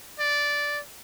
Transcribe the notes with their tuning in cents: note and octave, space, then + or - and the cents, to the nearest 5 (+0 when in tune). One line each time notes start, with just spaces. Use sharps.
D5 -10